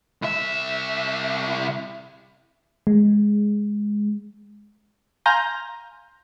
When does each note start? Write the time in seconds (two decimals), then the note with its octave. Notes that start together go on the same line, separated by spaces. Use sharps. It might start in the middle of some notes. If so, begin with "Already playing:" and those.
0.22 C2 E5
2.87 G#3
5.26 F5 G#5 A#5 C6 G6 A#6